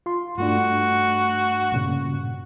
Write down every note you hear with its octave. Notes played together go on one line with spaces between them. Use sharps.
F4 C6
G2 A3 D4 F#4
G2 A#2 C#3